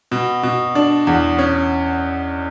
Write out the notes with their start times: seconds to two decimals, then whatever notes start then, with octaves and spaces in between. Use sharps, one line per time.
0.11 B2
0.43 B2
0.75 D4
1.07 E2
1.39 C#4